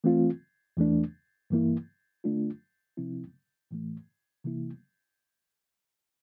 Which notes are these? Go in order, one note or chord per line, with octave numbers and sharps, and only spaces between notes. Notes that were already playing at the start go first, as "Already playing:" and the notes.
E3 A3 C4 F4
E2 E3 A3 D4
G2 E3 A#3 E4
D3 A3 D4 F4
C3 F3 C4 E4
A2 E3 A3
C3 E3 A#3 E4